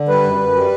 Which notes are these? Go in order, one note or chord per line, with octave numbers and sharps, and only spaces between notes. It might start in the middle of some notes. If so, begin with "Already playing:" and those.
Already playing: D3
G3 B4
F#2
F#2
G3